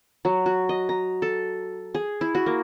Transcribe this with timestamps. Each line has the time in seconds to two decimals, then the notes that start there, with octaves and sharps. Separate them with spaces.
0.25 F#3
0.46 F#4
0.69 D#5
0.89 A#5
1.22 A4
1.95 G#4
2.21 E4
2.35 F#4
2.46 A#3